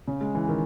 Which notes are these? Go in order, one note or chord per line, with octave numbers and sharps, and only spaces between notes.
C#3
G#3
E3
D#3